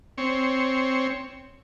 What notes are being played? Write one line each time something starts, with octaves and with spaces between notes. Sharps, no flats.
C4 C#5